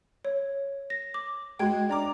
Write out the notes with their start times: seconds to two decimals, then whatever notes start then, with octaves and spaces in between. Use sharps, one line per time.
0.25 C#5
0.90 A#6
1.14 D6
1.59 G#3 F#4 G5 G#6
1.89 D4 A#5 D6